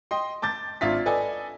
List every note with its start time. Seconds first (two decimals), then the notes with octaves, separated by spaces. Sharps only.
0.11 D#5 G5 C6
0.42 A5 D6 G6 A6
0.81 G#1 D4 F4 E5 A6 B6
1.06 A4 B4 D5 D#5 G#5